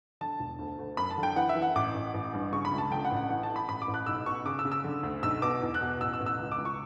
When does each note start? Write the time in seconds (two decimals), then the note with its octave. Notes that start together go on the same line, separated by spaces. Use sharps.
0.21 D3 A5
0.40 E1
0.59 D2
0.79 D2
0.97 F#2 B5
1.10 A5
1.18 D3
1.23 G5
1.36 E3 F#5
1.49 E5
1.55 E3
1.62 F#5
1.75 A1 D6
1.94 A1
2.14 A1
2.33 G2
2.52 C#3 C#6
2.65 B5
2.72 C#2
2.78 A5
2.91 D3 G5
3.05 F#5
3.11 A1
3.17 F#5
3.29 E3 F#5
3.43 A5
3.49 E3
3.56 B5
3.69 A1 B5
3.82 D6
3.88 A1
3.94 F#6
4.06 B1 E6
4.26 B2 C#6
4.45 C#3 D6
4.59 E6
4.65 C#3
4.72 E6
4.84 D3
5.03 D2
5.23 B1 E6
5.42 B2 D6
5.62 E2
5.74 F#6
5.81 B2
6.01 A1 E6
6.13 E6
6.20 A1
6.26 E6
6.38 C#2
6.52 D6
6.58 C#2
6.65 C#6